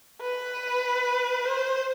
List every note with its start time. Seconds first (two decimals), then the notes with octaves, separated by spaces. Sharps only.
0.21 B4
1.45 C5